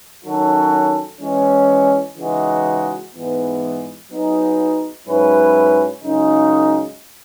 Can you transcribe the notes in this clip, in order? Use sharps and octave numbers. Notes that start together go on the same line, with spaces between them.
D#3 F#3 C#4 F#4 A4
E3 G#3 C#4
C#3 E3 G#3 D#4 F#4
G#2 E3 G#3 B3
F#3 B3 D#4 G#4
G#2 F#3 C#4 E4 B4
F#2 C#3 G#3 D#4